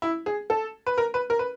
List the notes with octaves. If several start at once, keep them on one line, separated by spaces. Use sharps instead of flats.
E4
G#4
A4
B4
A#4
B4
A#4
B4